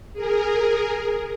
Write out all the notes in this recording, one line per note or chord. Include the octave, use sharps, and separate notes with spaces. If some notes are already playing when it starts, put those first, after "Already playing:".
G#4 A#4